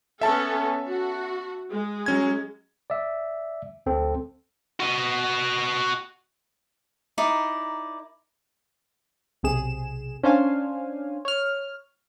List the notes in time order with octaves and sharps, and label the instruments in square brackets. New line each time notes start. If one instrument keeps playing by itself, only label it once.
[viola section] B3 C#4 A4 [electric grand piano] E5 A5
[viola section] F#4
G#3
[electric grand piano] F#3 C#4 G#6
[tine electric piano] D5 E5
D2 C4 A4
[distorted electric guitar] F#4 D#5
[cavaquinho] D#4 E4 A#4 D5
[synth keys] B1 C3 G#4 E7
C#4 D4 C5 C#5 F5 G#5
C#5 F6